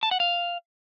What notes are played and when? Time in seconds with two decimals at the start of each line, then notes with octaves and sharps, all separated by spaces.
0.03 A5
0.11 F#5
0.20 F5